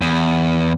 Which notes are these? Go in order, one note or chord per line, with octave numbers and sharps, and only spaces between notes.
E2